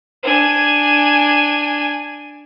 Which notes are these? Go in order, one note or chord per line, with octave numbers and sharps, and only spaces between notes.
D4 G#5